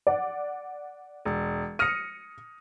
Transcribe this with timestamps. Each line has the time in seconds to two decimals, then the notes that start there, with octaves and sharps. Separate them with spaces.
0.07 D5 F#5
1.25 E1
1.79 D#6 F6 A#6 C#7 D#7